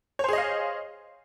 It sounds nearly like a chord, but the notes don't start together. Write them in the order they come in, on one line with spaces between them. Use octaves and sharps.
C#5 C5 G#4 D#5 F5